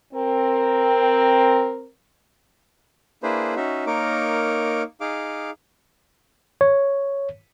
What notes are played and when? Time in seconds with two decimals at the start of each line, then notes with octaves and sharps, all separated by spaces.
0.14 C4 A#4
3.23 A#3 D4 E4 G#4 B4 C5
3.56 C#4 D#4 F#4 E5
3.87 A#3 D#4 A#4 C#5 D6
5.01 D#4 G#4 F5 D6
6.61 C#5